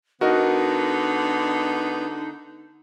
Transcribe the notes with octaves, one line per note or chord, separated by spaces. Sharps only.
D3 B3 D#4 F#4 A#4 D#5